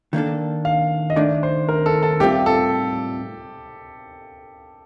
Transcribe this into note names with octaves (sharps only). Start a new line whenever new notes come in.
D#3 A#3 D4 A4
F5
D#5
D#3 A3 D4 D5
C5
A#4
A4
A4
A2 G3 C4 F4 G4
A4